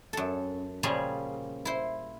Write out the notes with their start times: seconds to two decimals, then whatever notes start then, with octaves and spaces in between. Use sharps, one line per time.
0.13 F#2 A4
0.83 A#2 C#3 F3 G3 C#4 G#4
1.65 E4 C5